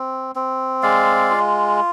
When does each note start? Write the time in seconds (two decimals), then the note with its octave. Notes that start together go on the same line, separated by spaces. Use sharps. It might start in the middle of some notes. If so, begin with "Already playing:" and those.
Already playing: C4
0.35 C4
0.83 G#3 D5 F5
1.31 F4